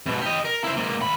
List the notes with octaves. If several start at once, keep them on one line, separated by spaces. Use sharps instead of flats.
G#2 B2
G4 D#5
A#4
E4 C5
G#2 A#3
D#2 B5